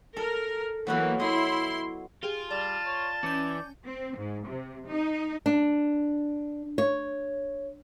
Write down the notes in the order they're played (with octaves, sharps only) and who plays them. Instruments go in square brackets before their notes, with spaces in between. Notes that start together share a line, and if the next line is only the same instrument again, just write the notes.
[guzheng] A4 [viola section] A#4
[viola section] E3 A#3 [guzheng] F#3 B3 F#4
[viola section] E4 C6 [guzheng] C#5 D#5
[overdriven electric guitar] F4 [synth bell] G4 G#4
[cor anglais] G3 [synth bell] D5 [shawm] A5
[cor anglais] C#5
[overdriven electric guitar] E3 [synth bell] C#4 G6 [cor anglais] D5
[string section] C4
G#2
C3
D#4
[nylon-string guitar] D4
C#5